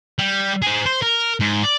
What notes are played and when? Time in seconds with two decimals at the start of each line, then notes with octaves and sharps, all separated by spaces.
0.19 G3
0.62 G#4 C5
0.86 C5
1.02 A#4
1.40 G#2
1.63 D5